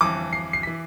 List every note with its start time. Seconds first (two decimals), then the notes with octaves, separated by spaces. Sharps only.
0.01 G1 F2 E3 D6
0.33 C7
0.53 C7
0.63 E3 B6